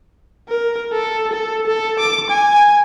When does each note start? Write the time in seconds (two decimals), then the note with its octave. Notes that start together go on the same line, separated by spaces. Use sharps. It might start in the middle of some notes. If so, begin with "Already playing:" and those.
0.48 A#4
0.92 A4
1.33 A4
1.67 A4
2.00 D6
2.30 G#5